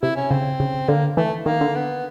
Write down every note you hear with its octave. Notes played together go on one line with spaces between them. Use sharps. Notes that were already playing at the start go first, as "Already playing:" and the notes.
C3 E4
C#4
C#3 C4
C#3
D3 A#3
E3 A3
D#3 A#3
D3
B3